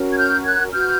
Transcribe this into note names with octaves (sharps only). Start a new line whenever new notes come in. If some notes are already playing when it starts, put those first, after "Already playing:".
Already playing: C#4 F#4 A#4
G#6
F6 G6
F#6 G#6
F#4 B4 F6 G6